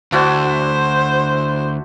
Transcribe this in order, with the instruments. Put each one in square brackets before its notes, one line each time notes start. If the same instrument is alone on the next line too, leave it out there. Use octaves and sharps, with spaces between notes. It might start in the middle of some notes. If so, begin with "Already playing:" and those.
[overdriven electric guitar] D2 [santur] D4 E4 F#4 [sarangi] C5